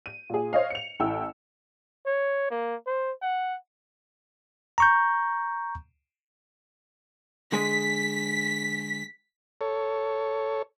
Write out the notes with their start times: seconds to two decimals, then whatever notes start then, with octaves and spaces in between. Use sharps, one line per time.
0.06 D#7
0.30 A#2 G#4
0.53 C5 C#5 D#5 F5
0.70 C#7 F7
1.00 A1 E4 G5 E6
2.06 C#5
2.51 A#3
2.86 C5
3.22 F#5
4.78 A#5 C#6 G6
7.52 D3 G#3 G#4 B6
9.61 A4 C#5